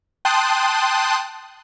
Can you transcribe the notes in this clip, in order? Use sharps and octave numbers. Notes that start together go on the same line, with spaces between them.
G5 A5 C6 D#6 F#6